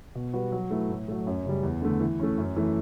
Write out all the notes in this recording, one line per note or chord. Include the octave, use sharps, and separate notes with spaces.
B2
G3 B3 F#4 B4
F#3
A3 E4 B4
A2
F#3 A3
F#2
C#3 G3
E2
D3 A3
E3
A3 C#4
F#2
E3 A3